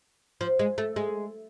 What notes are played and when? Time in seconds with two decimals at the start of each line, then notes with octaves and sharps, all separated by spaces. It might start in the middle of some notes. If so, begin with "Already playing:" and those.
0.41 F3
0.59 G#3
0.78 A3
0.96 G#3